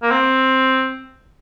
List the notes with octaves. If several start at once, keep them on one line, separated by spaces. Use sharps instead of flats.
A#3
C4